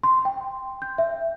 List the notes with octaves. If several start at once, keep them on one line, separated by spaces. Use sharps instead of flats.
C6
G5
G6
E5